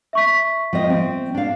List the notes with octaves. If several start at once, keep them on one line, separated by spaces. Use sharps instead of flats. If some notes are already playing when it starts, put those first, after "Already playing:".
E5 C#6 B6
F3 C4 D#5
C4
D4 F5